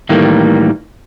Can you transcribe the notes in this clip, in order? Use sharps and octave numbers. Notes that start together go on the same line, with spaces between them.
A2 D#3 E3 G3 A3 A#3